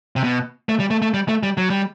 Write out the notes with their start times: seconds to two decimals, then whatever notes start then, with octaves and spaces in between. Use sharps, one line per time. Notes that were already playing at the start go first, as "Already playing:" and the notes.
0.16 C3
0.24 B2
0.69 A3
0.80 G3
0.91 A3
1.02 A3
1.14 G3
1.29 A3
1.43 G3
1.57 F#3
1.70 G3